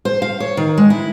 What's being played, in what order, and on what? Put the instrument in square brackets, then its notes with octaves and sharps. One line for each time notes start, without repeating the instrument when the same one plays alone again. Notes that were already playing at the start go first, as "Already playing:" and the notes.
[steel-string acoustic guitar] C5
F5
C#5
D#3
G#3
E4